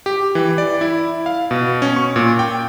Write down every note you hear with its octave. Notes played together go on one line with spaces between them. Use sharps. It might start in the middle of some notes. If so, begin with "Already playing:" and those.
G4
E3
D5
E4
F5
B2
C#4
C#6
A#2
G5